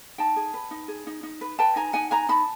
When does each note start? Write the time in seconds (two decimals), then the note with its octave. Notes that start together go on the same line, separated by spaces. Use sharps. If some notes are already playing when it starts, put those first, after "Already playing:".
0.18 D#4 G5 A5
0.36 G#4
0.54 B4
0.71 D#4
0.88 G#4
1.07 D#4
1.23 D#4
1.41 B4
1.59 B4 G5 A5
1.76 D#4 G#5 A#5
1.93 D#4 F#5 G#5
2.11 B4 G#5 A#5
2.29 D#4 A5 B5